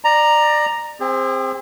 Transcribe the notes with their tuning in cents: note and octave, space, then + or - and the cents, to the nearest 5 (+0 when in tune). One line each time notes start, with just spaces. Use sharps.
D5 +25 A#5 +0
C4 +5 G#4 -35